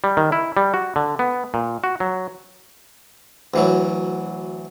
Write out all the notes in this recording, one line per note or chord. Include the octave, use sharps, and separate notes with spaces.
G3
D#3
E4
G3
F#4
D3
B3
A#2
F#4
F#3
D2 E3 F#3